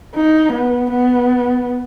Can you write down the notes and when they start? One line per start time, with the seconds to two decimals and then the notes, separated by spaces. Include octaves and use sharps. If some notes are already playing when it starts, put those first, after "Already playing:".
0.15 D#4
0.53 B3
0.91 B3